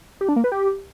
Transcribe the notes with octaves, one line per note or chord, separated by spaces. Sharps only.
G4
D4
A#3
B4
G4